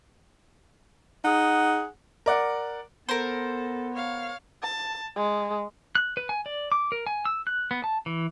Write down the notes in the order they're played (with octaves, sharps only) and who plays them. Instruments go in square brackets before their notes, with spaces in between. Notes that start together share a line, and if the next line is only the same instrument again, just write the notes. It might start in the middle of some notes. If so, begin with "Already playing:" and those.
[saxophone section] D#4 G#4 F#5
[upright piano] A#4 D5 F#5
[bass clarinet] B3 [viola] A4 [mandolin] A#4 C5
[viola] C#5 F5
[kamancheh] A5
G#3
[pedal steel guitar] F#6
B4
G#5
D5
D6
A#4
G#5
E6
F#6
B3
A5
E3